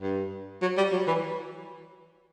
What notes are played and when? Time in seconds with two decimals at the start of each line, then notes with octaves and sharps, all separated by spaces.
0.01 G2
0.62 F#3
0.77 G3
0.92 F#3
1.08 E3